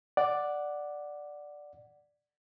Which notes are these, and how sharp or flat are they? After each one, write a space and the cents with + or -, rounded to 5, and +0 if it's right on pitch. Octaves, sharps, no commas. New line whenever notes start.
D5 +0 F#5 +0